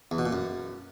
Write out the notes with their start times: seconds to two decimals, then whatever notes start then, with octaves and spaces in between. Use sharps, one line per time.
0.11 E2
0.18 B2
0.26 A#2
0.33 F#2